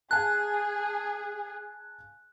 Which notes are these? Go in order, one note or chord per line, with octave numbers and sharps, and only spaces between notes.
G#4 F5 G#5 A5 F#6